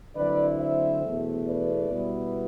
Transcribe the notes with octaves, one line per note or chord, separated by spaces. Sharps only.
D3 F#3 C4 E4 B4 D5
C5 E5
E2 B2 A3
B4 D5
B2 G3 B3 E4